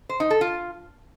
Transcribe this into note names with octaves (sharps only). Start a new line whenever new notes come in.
C5
D#4
A4
F4